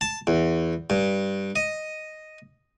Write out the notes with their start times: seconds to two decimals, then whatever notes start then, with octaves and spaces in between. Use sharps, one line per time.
0.01 A5
0.27 E2
0.90 G2
1.56 D#5